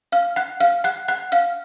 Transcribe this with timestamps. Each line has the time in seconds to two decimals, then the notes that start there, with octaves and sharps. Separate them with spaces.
0.12 F5 F6
0.36 F#5 F#6
0.60 F5 F6
0.84 F#5 F#6
1.08 F#5 F#6
1.32 F5 F6